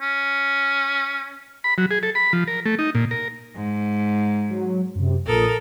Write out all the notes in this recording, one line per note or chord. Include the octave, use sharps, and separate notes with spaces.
C#4
B5
F#3
G#4
A4
B5
F3
A#4
A3
D#4
A#2
A#4
G#2
F#3
F#2 C3
A#1 A#2 A4 A#4 D#6